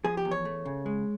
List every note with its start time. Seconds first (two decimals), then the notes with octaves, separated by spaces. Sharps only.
0.04 F3 G#4
0.17 G4
0.25 E2
0.31 C#5
0.45 A3
0.65 C#3
0.86 G#3